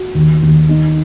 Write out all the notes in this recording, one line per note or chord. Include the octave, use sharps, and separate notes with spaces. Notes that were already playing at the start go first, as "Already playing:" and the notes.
Already playing: F#4
D#2
D#2
D#4